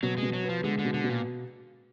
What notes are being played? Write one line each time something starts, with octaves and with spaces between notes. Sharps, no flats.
B2 F#3
B2 G#3
F#3
B3
F3
D3 G#3
D3
B2
D3
B2
A#2